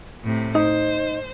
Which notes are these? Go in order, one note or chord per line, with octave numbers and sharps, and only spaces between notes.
A2 C3
D#4 C5